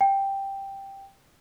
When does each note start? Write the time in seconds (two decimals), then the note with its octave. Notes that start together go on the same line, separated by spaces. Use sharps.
0.01 G5